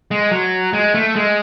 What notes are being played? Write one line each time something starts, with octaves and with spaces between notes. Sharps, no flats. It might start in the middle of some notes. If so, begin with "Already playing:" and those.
G#3
F#3
G#3
A3
G#3